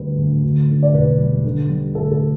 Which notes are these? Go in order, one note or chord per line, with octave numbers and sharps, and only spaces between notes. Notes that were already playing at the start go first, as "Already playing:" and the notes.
Already playing: D2 G3 B4
D2
D2
D3
D5
E1 B4
G3
D3
G3
D2 A4
A4